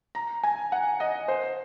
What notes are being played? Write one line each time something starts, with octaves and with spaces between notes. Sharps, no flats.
A#5
G#5
F#5
D#5
C5